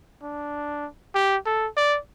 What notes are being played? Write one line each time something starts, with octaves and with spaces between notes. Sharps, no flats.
D4
G4
A4
D5